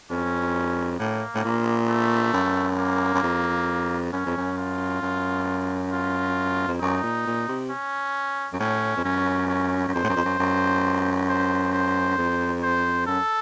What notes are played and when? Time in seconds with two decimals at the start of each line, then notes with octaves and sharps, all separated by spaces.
0.10 F2 C#4
0.99 A2 A#3
1.35 A2
1.45 A#2
1.89 A3
2.33 F#2
2.79 A#3
3.14 F#2
3.23 F2
4.12 F#2 C#4
4.26 F2
4.37 F#2
4.58 F4
5.02 F#2
5.92 F4
6.68 F2
6.80 F#2 D#4
7.03 A#2
7.26 A#2
7.48 C3
7.70 C#4
8.53 F#2
8.60 A2 C#4
8.97 F2
9.04 F#2 C#4
9.49 C#4
9.88 F#2
9.94 F2 C5
10.04 A2
10.09 F#2
10.16 F2
10.25 F#2
10.39 F#2
11.29 C5
11.73 C5
12.18 F2
12.63 C5
13.07 F#2 A4